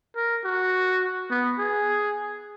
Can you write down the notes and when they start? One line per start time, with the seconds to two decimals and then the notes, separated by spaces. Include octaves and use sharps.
0.16 A#4
0.44 F#4
1.30 B3
1.59 G#4